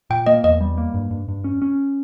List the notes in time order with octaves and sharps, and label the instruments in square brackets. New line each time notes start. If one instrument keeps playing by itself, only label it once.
[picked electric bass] A#2 [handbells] G5
[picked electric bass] A#3 [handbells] D#5
[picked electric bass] E2 [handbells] D#5
[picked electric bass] G3
A#3
G2
G2
G2
C#4
C#4